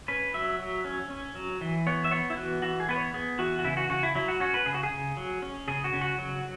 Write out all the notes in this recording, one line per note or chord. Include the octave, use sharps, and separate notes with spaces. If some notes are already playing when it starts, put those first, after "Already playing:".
C#4 B4
F#3 E5
F#3
C#4
C#4
F#3
E3
B3 C#5
E5
B3 C#5
E4
E3 F#4
E3 F#4
G#4
B3 B4
C#5
B3 G#4
E3 F#4
F#4
C#3 E4
F#4
C#3 F#4
E4
F#3 E4
F#4
C#4 F#4
B4
C#3 G#4
F#4
G#4
C#3
F#3
C#4
C#3 G#4
F#4
C#3
F#4
F#3